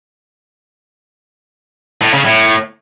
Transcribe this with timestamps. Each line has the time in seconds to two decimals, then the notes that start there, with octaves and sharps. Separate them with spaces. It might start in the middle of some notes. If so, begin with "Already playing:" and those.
2.02 A2
2.14 C#3
2.26 A2